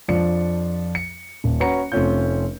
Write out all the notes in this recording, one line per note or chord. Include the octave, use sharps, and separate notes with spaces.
F2 F3 D4 C#7
C#7
D#1
C#4 F#4 B4 A#5 C#7
F1 A3 C4 C#4 F4 G6